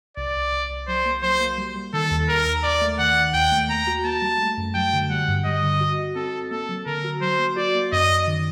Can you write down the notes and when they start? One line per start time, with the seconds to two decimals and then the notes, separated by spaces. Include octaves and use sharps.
0.17 C2 D5
0.35 C2
0.52 C2
0.70 C2
0.88 F#3 C5
1.06 A#3
1.23 F#3 C5
1.40 A#3
1.58 G3
1.76 G3
1.93 D#3 A4
2.11 D#2
2.29 D#2 A#4
2.46 D#2
2.63 D#2 D5
2.81 A3
2.99 D#3 F#5
3.17 D#3
3.34 D#2 G5
3.52 A3
3.69 A#3 A#5
3.87 F#4
4.05 A#3 A5
4.22 G3
4.40 A3
4.57 F#2
4.74 F#3 G5
4.93 D3
5.10 G3 F#5
5.28 G2
5.45 G3 D#5
5.63 D3
5.81 F#4
5.98 F#4
6.16 C4 A4
6.34 C4
6.51 A#3 A4
6.69 F#3
6.86 D3 A#4
7.04 F#4
7.21 F#3 C5
7.39 A#3
7.57 F#4 D5
7.75 A#3
7.92 F#2 D#5
8.10 F#2
8.27 D#3